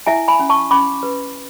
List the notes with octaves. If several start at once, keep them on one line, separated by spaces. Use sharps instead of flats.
E4 E5 G#5
G#5 B5
C#4
A5 C#6
C#4 B5 D6
B4